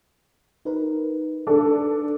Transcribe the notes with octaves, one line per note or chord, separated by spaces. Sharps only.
D#4 A#4 B4
D4 A4